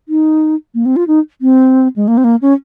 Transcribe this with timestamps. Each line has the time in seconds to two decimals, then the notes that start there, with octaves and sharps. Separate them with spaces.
0.08 D#4
0.74 A#3
0.85 C4
0.96 F4
1.08 D#4
1.41 C4
1.96 G#3
2.08 A#3
2.17 C4
2.24 A#3
2.42 C#4